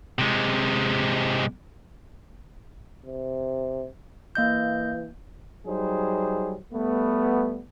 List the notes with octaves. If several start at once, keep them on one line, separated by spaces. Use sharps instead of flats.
C3 G#3
C3
E3 A#3 D#5 G6
F#3 G3 D#4 G#4 C5
G3 A3 B3